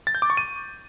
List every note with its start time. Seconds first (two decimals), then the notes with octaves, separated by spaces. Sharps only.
0.07 A6
0.15 G6
0.22 D6
0.30 C#6
0.37 D#7